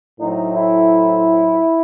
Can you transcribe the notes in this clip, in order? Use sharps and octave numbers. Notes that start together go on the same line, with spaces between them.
A2 F#3 A3 C4 D#4
E4